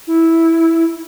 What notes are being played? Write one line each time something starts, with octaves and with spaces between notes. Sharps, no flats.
E4